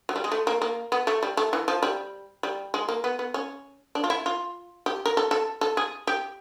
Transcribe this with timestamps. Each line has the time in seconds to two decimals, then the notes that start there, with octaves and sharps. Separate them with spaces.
0.09 F#3
0.16 G3
0.24 G#3
0.32 A3
0.47 A#3
0.62 A#3
0.92 B3
1.07 A3
1.23 G3
1.37 A3
1.53 E3
1.68 F3
1.83 G3
2.43 G3
2.74 G#3
2.89 A#3
3.04 B3
3.19 B3
3.34 C#4
3.95 D4
4.04 F4
4.10 E4
4.26 F4
4.86 G4
5.06 A#4
5.17 A4
5.31 A4
5.61 A4
5.77 G#4
6.07 G4